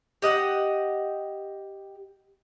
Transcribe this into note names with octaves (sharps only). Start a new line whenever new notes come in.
G4 D#5 F#5